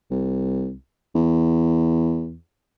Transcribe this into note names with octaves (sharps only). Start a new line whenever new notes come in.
C2
E2